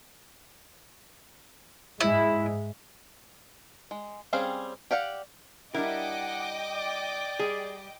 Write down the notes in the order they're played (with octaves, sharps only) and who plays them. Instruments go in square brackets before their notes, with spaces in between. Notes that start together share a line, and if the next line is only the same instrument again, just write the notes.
[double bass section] G#2 G#3 [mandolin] E4
[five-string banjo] G#3
G3 C4 C#4 G#4 F5
G4 D5 F5 F#5
[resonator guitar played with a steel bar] G3 D4 E4 [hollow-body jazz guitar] A#4 [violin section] D#5 G5 D6 [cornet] F#5
[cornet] D5
[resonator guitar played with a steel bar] G3 [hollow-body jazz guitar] G#4